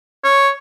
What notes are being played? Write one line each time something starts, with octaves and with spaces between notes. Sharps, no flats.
C#5